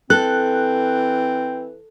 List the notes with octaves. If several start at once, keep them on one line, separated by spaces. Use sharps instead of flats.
E3 C4 A4 F#6